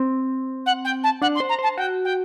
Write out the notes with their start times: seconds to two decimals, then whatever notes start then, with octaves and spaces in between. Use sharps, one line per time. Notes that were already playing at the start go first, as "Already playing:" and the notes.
Already playing: C4
0.66 F#5
0.84 G5
1.03 A5
1.22 D4 F#5
1.35 C6
1.40 C5
1.49 A#5
1.59 C5 A5
1.77 F#4 G5
2.04 G5